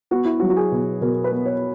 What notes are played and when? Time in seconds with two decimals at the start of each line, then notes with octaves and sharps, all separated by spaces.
0.11 B3 F#4
0.25 E4
0.40 F#4
0.42 F#3
0.50 F#4
0.56 G#4
0.72 B2
1.01 B2 A#4
1.24 B4
1.32 B3
1.46 C#5